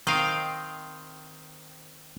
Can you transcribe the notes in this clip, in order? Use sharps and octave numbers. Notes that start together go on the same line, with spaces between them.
D#3 C4 D#5 F5 G5